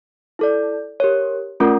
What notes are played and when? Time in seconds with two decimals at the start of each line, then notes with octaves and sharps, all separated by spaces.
0.39 E4 A4 D5
1.00 G4 A#4 C#5
1.60 A3 C#4 F4 A#4